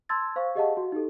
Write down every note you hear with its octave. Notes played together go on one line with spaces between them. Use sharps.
A5 C6 E6 G#6 A6
C5 F5 C#6
G4 G#4 D#5 F5 F#5 A5
F#4
D#4 G4 A4